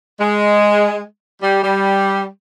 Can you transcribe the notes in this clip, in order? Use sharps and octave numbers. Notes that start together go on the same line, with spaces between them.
G#3
G3
G3